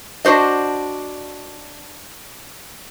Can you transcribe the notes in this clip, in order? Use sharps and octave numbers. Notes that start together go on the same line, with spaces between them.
D4 F#4 C5 D#5